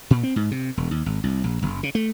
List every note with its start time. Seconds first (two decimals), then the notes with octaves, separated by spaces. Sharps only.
0.10 A#2
0.23 C4
0.36 G#2
0.51 C3
0.77 E1
0.91 D#2
1.06 G#1
1.24 C2
1.44 A#1
1.62 F#1
1.83 C#3
1.95 A3